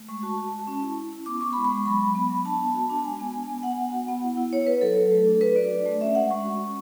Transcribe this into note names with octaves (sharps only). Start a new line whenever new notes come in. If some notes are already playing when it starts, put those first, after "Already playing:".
Already playing: A3
G#3 C#6
F#4 A5
F#4
G#3
C#4
E4
C#4
E4
B3 D6
B3 C#6
G#3 B5
C#6
G#3
F#3 B5
F#3
B3
F#3
D4 A5
B3
F#4
D4
G#3 G#5
B3
D4
B3
B3 F#5
B3
F#4
B3
E4
E4
B3 C#5
E4 B4
F#3 A4
F#3
A3
D4
F#3 B4
F#4 D5
D4
A3
C#4 E5
G#3 F#5
G#3 C#6
F#4
C#4